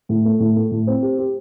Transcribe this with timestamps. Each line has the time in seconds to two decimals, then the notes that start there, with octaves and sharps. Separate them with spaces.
0.09 A2
0.25 A3
0.40 A2
0.56 A3
0.71 A2
0.87 C4
1.03 G4
1.19 G4